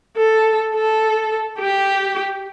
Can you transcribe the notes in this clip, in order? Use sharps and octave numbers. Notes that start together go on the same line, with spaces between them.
A4
A4
G4